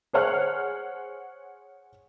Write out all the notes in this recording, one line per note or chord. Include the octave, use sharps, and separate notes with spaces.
G#4 C5 C#5 F#5 F6 F#6